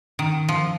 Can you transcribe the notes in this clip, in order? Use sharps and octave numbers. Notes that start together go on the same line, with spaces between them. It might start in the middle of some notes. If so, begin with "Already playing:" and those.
D#3
F3